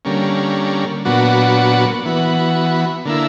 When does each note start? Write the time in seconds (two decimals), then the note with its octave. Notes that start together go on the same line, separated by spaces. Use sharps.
0.05 D3 G3 A#3 C#4
1.05 A#2 F#3 B3 D4 F#4
2.05 E3 B3 F#4
3.05 D3 A#3 E4